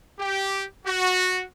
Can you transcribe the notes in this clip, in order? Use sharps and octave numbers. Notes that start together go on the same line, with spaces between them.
G4
F#4